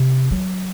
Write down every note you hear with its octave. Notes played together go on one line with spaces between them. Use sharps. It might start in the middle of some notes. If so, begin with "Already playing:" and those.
Already playing: C3
F#3